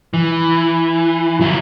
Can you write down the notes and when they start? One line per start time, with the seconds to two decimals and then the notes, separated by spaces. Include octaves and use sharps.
0.14 E3
1.41 F#3 E4